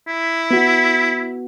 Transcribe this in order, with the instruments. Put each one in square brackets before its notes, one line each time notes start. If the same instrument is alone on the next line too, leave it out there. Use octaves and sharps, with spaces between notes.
[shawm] E4
[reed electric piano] B3 F#4